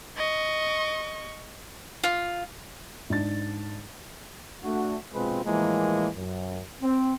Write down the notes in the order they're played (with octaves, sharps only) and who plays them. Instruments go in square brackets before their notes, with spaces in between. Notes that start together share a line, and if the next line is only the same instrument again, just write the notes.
[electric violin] D#5 C#6
[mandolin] F4
[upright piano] G#2 D4 A6
[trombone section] A3 D4 F#4
A#1 B2 G#3 C4 F4 B4
A2 E3 F3 G#3 A#3
F#2
C4